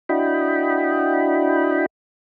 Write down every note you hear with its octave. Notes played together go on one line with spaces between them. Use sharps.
D4 E4 F#4 D#5 G5 B5